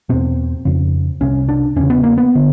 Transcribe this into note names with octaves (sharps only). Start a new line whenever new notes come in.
E2 B2 C4
F2 C#3
C2 C3 C#4
D4
E2 C#3 C#4
B3
A#3
B3
D3